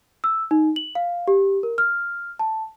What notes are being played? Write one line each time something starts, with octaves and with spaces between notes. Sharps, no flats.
E6
D#4
F#7
F5
G4
A#4
F6
A5